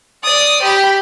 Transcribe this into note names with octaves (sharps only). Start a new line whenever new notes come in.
D5 D#6
G4 B5